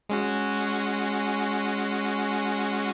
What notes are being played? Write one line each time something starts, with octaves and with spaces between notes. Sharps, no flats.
G#3 C#4 F#4